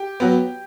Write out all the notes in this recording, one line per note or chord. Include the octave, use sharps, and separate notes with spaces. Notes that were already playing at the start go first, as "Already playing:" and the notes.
Already playing: G4
F#3 B3